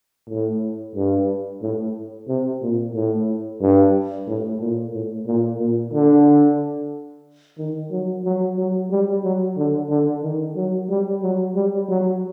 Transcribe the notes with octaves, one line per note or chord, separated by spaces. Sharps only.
A2
G2
A2
C3
A#2
A2
G2
A2
A#2
A2
A#2
A#2
D3
D#3
F#3
F#3
F#3
G3
F#3
D3
D3
D#3
F#3
G3
F#3
G3
F#3